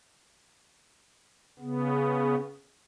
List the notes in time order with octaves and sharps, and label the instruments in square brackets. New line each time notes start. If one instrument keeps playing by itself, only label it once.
[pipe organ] C#3 B3